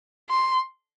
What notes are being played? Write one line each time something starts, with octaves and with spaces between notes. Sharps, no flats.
C6